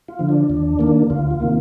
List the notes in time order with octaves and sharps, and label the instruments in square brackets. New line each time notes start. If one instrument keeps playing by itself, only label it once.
[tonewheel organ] F4
D3 F3
D4
D#2
D#3 A#3
D2 F4
F4
C3 D#3 A#3